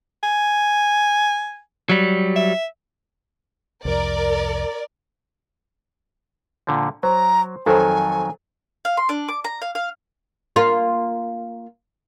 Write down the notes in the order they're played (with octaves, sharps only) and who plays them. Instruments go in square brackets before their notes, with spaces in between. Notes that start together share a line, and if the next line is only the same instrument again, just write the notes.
[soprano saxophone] G#5
[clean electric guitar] F#3 G3
[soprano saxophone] E5
[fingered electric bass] C2 F2 [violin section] A#4 D5
[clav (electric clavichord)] A#2 D3 F3
[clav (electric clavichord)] F#3 [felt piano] C5 [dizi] A#5
[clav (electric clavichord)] F2 D#3 F#3 [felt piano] A4 C5 [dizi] G#5
[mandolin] F5
C6
D4
D6
A#5
F5
F5
[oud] A#3 F4